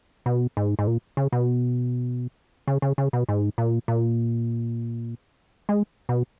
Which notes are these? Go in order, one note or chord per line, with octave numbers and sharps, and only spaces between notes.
B2
G#2
G#2
A#2
C#3
B2
C#3
C#3
C#3
B2
G#2
A#2
A#2
G#3
B2